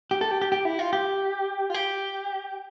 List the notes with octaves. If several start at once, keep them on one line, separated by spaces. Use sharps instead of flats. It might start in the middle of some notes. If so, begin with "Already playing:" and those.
G4
A4
G4
G4
G4
E4
F4
G4
F4
G4